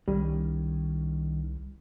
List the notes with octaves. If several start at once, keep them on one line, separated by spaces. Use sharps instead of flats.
C2 D#3 G3 C#4